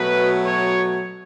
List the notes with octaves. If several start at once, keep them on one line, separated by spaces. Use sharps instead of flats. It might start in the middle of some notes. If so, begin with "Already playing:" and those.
Already playing: B2 F#3 A3 B4
C#5